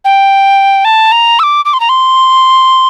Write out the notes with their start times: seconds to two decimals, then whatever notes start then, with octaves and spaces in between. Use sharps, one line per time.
0.05 G5
0.85 A5
1.12 A#5
1.39 E6
1.43 D6
1.65 D6
1.73 C6
1.80 A#5
1.89 C6